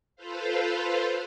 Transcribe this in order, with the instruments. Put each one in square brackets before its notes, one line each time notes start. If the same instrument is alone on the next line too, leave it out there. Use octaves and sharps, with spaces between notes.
[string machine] F4 A4 B4 C5 F5